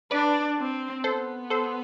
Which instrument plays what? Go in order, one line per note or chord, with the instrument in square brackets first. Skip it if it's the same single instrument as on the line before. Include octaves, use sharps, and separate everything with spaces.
[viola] D4 [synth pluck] B4 D5
[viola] C4
[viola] B3 [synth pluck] A4 C5
[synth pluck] A4 C5